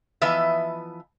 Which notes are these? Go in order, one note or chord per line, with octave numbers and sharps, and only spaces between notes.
E3 F3 B3 B4 D#5 E5